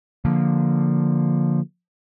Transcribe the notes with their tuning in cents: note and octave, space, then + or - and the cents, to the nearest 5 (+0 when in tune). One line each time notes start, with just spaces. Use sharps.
D3 -5 F3 +0 A#3 +0